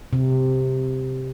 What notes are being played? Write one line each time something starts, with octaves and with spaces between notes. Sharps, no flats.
C3